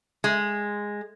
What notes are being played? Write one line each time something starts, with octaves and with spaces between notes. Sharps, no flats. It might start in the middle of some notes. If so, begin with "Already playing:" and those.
G#3